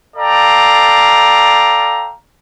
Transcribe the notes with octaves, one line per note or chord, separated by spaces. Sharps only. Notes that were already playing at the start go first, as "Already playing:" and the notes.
A4 D5 F5 G5 A#5